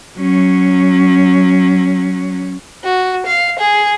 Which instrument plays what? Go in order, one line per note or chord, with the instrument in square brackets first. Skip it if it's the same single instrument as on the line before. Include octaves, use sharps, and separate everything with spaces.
[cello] F#3 C#4
[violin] F#4
F5
G#4